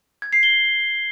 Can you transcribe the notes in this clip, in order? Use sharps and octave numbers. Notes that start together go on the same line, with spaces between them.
G#6
C7
G7